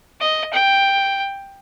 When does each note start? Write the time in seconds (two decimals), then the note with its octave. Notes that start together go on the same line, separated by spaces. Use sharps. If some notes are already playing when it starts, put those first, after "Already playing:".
0.20 D#5
0.53 G5